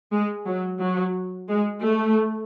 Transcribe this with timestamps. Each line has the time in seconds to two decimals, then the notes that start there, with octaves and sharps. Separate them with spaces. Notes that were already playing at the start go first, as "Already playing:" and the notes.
0.13 G#3
0.47 F#3
0.80 F#3
1.49 G#3
1.83 A3